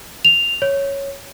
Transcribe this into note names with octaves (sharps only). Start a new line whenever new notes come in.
F7
C#5